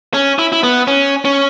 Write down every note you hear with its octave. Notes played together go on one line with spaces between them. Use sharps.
C#4
E4
E4
B3
C#4
C#4